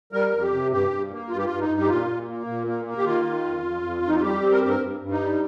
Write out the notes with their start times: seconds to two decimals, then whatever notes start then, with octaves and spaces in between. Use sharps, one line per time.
0.12 G3 A#4
0.32 F2
0.42 G4
0.52 C3
0.71 G2 G4
0.91 G2
1.11 A#3
1.30 G2 F4
1.37 G4
1.45 G2 F4
1.59 D#4
1.69 G2
1.80 G4
1.88 A#2 F4
2.08 A#2
2.28 A#3
2.47 A#2
2.67 A#3
2.85 A#3
2.98 G4
3.05 D#3 F4
3.25 D#3
3.45 F2
3.63 F2
3.83 F2
4.03 F2
4.08 D#4
4.15 F4
4.22 G3 G4
4.41 C4
4.51 A#4
4.61 G2 G4
4.68 A#4
4.80 G2
5.00 G2
5.11 D#4
5.20 G3